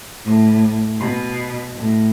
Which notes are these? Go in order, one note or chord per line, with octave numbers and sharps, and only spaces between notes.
A2
B2
A2